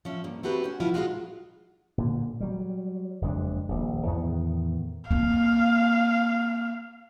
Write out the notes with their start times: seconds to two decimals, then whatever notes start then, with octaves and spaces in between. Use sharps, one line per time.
0.05 F3 C#4 E5
0.24 D2 G2 A#3
0.43 A3 C4 F#4 G4 B4
0.64 C#4 F#4
0.80 F3 E4 F4
0.94 F#3 G#3 C#4 D#4 F4 F#4
1.98 A#2 D3
2.40 F#3 G3
3.22 F#1 F2 G#3 D4
3.68 D#1 A#1
4.06 E2 A2 D#3 B3
5.11 A#3 C4 F5